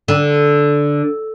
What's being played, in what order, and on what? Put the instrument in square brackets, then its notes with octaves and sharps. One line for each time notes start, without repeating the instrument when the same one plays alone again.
[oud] D3